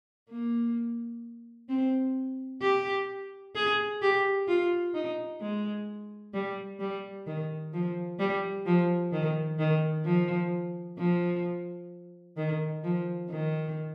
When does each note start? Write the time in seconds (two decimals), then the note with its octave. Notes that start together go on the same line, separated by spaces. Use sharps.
0.30 A#3
1.69 C4
2.62 G4
3.55 G#4
4.02 G4
4.48 F4
4.94 D#4
5.41 G#3
6.33 G3
6.80 G3
7.27 D#3
7.73 F3
8.19 G3
8.66 F3
9.12 D#3
9.59 D#3
10.05 F3
10.98 F3
12.37 D#3
12.84 F3
13.30 D#3